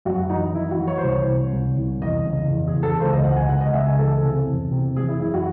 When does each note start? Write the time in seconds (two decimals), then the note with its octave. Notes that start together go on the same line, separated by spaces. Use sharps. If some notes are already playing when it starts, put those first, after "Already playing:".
0.05 F#2 F#4
0.29 E3 D#4
0.55 E3 E4
0.71 F#4
0.78 E3
0.87 C#5
0.98 C5
1.03 C2 C#5
1.28 C3
1.53 C2
1.77 C2
2.01 E2 D#5
2.27 C#3
2.50 E2
2.67 G#4
2.76 E2
2.83 A4
3.00 C#2 C5
3.13 D#5
3.24 C#2 F#5
3.37 G#5
3.48 C#2 F#5
3.61 D#5
3.74 C#3 E5
3.86 G#5
3.99 E3 A4
4.23 C3
4.47 E2
4.71 C3
4.96 E3 G#4
5.08 E4
5.20 F#2 E4
5.34 F#4